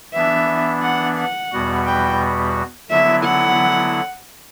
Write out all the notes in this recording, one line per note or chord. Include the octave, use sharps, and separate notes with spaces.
E3 B3 D4 E5
F#5
F#5
E2 B2 G3 B3 F#4
G5
D3 F#3 B3 E4 E5
F#5